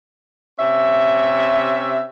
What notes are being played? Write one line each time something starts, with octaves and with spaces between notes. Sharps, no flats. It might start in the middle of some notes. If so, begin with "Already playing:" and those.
C3 C#4 E5